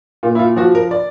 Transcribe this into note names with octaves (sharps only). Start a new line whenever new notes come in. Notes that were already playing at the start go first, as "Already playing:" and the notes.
A#2 F4
E4
F4
F3 F#4
A#4
D5